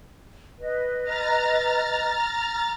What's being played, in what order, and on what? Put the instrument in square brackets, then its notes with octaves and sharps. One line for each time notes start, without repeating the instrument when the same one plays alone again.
[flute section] B4 D#5
[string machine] A#5 F6 A6